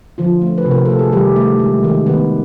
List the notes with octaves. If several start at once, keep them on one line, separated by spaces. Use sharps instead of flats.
D3 F3 F4
A3
B4
C3
A#4
A3 A4
G#4
D#3 G3 G4
A3
G#3
D#3
D#3 B3 B4